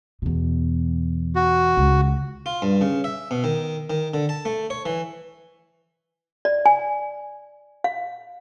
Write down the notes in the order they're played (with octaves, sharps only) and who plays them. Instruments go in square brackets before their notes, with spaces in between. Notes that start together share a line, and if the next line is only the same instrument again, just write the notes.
[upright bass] E2 B2
[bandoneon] F#4
[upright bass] C#2
[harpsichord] F4
G2
C#3
E5
B2
D#3
D#3
D3
A5
A3
C#5
E3
[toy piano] D5
G#5
F5